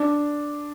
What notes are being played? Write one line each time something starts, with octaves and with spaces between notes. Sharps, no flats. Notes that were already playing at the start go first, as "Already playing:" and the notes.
Already playing: D4